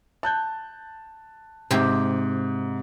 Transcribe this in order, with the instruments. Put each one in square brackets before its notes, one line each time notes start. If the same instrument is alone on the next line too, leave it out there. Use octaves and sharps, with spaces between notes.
[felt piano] A5 F#6 G6
[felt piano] G#2 [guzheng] C3 G4